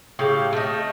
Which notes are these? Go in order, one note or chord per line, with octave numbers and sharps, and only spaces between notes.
A2 C#3 G4
A3 D#5